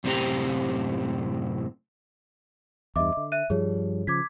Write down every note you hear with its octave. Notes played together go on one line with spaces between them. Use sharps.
F#2 A2 C3 C4 G4 A#5
E2 G2 D#5 E5 D6
D3
E5 F#6 D#7
G2 F3 G3 G#4 C#5
C#3 F3 D6 G#6 B6